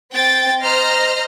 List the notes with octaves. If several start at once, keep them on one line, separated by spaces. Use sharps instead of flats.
C4 G5 A6
C5 D#5 A#5 F6 A#6